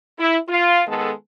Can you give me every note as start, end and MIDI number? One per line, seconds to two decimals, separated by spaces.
0.19 0.37 64
0.49 0.83 65
0.88 1.12 51
0.88 1.12 56
0.88 1.12 59
0.88 1.12 69